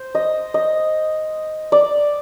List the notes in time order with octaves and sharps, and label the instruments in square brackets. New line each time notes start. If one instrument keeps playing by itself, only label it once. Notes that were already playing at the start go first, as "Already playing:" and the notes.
Already playing: [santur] C5
D#5
D#5
D5